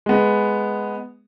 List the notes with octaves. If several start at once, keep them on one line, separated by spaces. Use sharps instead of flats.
G#3 B3